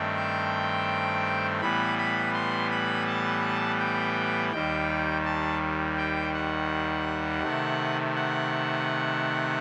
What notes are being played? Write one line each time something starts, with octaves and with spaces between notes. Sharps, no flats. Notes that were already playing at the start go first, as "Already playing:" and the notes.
Already playing: G2 D#3 A3 C4
G5
A2 E3 G3 B3 B5
B5
C6
B5
A5
G5
D#2 D#3 G3 G5
A5
G5
F#5
C3 D#3 A3
F#5